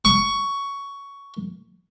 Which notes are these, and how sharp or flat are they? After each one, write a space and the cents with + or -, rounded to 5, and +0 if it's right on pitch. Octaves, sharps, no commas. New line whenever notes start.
C#6 +10